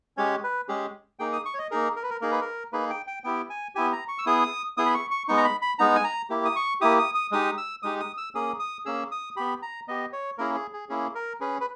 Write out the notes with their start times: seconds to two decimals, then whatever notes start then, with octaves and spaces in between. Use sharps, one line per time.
0.17 G#3 C#4 G4 C#5
0.43 B4
0.68 G#3 C#4 G4 G#4
1.19 A#3 D#4 G#4 G5
1.33 D#6
1.45 C#6
1.54 C#5
1.58 D#5
1.71 A#3 D#4 G#4 A#4
1.96 A#4
2.03 B4
2.10 A#4
2.21 A#3 D#4 G#4 A#4
2.31 B4
2.41 A#4
2.73 A#3 D#4 G#4 B4
2.90 G5
3.07 G5
3.24 B3 E4 G4 G5
3.50 G#5
3.75 B3 E4 G4 G#5
3.92 A#5
4.08 C#6
4.18 E6
4.26 B3 E4 G#4 D#6
4.77 B3 E4 G#4 D#6
4.86 B5
4.94 C#6
5.11 C#6
5.28 G#3 B3 D#4 C#6
5.37 A#5
5.44 B5
5.62 B5
5.79 G#3 B3 D#4 A#5
5.96 G#5
6.04 A#5
6.30 A#3 E4 G4
6.45 D#6
6.56 C#6
6.81 A#3 E4 G4 D#6
6.99 D#6
7.15 D#6
7.32 G#3 D#4 G4 D#6
7.58 E6
7.83 G#3 D#4 G4 D#6
8.00 D#6
8.17 E6
8.35 A#3 C#4 G#4 D#6
8.60 D#6
8.85 A#3 C#4 G#4 E6
9.11 D#6
9.36 B3 G4 B5
9.62 A#5
9.88 B3 G4 D#5
10.13 C#5
10.38 A#3 C#4 E4 G#4 A#4
10.55 G#4
10.73 G#4
10.89 A#3 C#4 E4 G#4
11.15 A#4
11.40 C#4 G#4 B4
11.61 B4